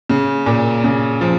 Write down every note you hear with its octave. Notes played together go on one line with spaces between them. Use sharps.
C#3
A#2
C#3
F3